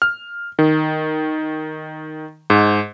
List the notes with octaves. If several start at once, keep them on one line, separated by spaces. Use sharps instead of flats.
F6
D#3
G#2